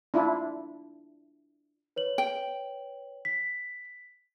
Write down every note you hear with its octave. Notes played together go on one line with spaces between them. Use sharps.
D4 E4 F4
B4 C#5 F#7
G5
B6